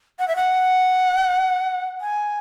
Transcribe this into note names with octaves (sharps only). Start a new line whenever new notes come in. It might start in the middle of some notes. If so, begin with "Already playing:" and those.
F#5
E5
F#5
G#5